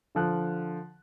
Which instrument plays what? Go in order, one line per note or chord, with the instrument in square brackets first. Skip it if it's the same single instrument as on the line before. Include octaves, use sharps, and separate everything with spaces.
[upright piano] D3 F3 F#6